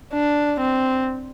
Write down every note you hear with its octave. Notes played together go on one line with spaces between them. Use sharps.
D4
C4